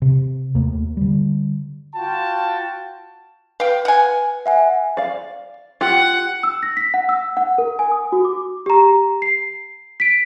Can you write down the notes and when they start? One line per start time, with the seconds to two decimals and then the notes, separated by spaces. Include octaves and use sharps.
0.02 C3
0.55 D#2 A3 A#3
0.97 D3 G3
1.96 F4 F#4 F5 G5 A5
3.60 B4 F5 G5
3.85 F#5 G#5
4.46 E5 F#5 G#5
4.97 D5 F5
5.81 F4 G4 F#5
6.43 E6
6.63 A#6
6.77 B6
6.94 F#5
7.09 E6
7.37 F#5
7.58 A#4
7.79 G#5
7.91 D#6
8.12 F#4
8.25 D6
8.66 G4 A#5
9.22 C7
10.00 B6 D7